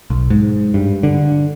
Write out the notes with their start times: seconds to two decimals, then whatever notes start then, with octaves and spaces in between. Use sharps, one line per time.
0.10 B1
0.30 G#2
0.74 G2
1.03 D3